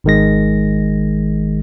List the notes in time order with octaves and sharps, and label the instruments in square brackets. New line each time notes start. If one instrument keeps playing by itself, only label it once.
[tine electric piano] G#1 D#3 G#3 A#6